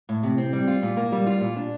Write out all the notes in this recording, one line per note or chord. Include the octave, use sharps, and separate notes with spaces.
A2
C3
C4
G3
F4
A#2
A#3
G3
F4
A#2
D4